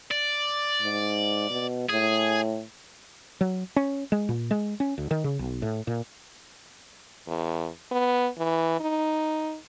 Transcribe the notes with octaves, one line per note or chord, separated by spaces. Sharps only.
D5
G#2
B2
A2 G#4
F#3
C#4
G#3
A#2
G#3
C#4
D2
D#3
C#3
B1
A2
A#2
E2
B3
E3
D#4